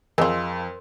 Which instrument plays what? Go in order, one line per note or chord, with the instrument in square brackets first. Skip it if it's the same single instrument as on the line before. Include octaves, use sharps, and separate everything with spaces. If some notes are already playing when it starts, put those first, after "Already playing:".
[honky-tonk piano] F2 [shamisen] G#3 F4 [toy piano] A#4 C6